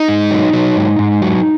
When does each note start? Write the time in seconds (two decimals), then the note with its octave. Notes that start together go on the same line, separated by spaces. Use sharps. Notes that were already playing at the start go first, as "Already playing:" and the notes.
Already playing: D#4
0.08 G#2
0.31 F#3
0.53 F#3
0.76 G#2
0.99 G#2
1.22 F#3